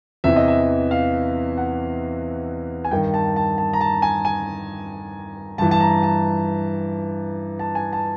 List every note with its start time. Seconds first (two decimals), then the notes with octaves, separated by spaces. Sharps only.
0.24 E2 C3 E3 E5
0.36 D#5
0.48 E5
0.91 F5
1.57 F#5
2.85 G#5
2.91 G2 D#3 G5
3.14 A5
3.36 A5
3.58 A5
3.73 A#5
3.81 A5
4.02 G#5
4.25 G#5
5.58 G2 E3 A5
5.71 A5
5.80 A#5
6.03 A5
7.59 A5
7.75 G#5
7.93 A5